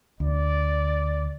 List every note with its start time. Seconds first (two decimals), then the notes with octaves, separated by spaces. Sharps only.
0.20 D2 D5